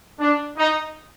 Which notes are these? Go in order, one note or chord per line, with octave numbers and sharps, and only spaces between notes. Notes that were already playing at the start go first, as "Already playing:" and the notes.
D4
D#4